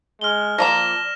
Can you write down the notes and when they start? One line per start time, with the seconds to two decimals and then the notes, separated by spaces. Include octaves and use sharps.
0.21 G#3 F6 G7
0.58 F3 A#3 D5 A#5 A#6 E7